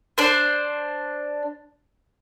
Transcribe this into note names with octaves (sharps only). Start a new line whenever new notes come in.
D4 C5